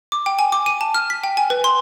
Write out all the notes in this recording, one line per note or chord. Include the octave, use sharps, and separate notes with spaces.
D6
G5
G#5
D6
D#7
A5
F6
B6
G5
G#5
B4
C6